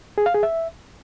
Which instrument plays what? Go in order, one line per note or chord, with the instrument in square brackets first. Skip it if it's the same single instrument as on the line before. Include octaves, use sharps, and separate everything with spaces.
[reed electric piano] G#4
F5
G#4
E5